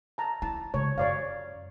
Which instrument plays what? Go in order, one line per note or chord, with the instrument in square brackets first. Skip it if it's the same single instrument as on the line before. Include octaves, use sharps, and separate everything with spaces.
[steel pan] A5 A#5
[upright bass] E4 [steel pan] A5
[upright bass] C#3 G#3 [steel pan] C#5
[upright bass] F#2 D3 [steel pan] C#5 D5 F5